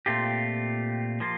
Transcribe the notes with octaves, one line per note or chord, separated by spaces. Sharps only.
A#2 A3 C4 F4 G4
F3 A#3 F4